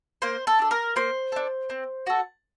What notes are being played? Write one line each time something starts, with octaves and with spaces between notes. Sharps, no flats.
A#3 C5
A4
D4 A4
A#4
A#3 C5
D4 A4
C4
F#4 A4